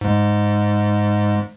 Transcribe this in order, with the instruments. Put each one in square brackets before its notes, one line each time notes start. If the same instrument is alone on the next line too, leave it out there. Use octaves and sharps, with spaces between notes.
[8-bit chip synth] G#2 G#3